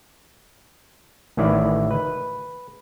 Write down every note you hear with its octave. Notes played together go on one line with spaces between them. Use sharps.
A1 A2 D#3 E3 E4 D5
B4